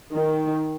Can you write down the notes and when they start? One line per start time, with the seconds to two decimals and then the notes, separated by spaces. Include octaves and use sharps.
0.13 D#3